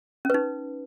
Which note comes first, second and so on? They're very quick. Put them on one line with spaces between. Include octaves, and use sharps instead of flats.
C#4 B4 D#4